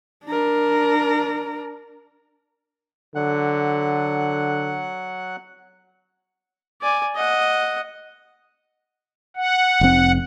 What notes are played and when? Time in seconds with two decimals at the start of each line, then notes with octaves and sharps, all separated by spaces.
0.25 D4 A#4
3.15 D3 F#3 F#5 F#6
6.82 D5 G#5
7.15 D#5 F#5
9.36 F#5
9.81 F1 C4